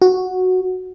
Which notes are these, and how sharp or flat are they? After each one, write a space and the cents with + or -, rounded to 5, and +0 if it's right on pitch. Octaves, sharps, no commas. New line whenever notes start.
F#4 -5